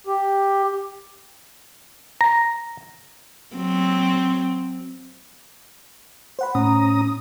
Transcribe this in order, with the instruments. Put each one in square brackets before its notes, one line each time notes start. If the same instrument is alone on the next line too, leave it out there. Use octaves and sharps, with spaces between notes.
[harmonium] G4
[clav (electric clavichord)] A#5
[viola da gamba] F#3 C4
[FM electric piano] C5 F#5 B5
[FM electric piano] A2 [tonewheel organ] C#4 A#5 D#6